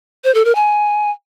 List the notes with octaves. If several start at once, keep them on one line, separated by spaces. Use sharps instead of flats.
C5
A4
A#4
G#5